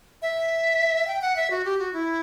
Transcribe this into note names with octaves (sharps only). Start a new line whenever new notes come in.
E5
G5
F#5
E5
F#4
G4
F#4
E4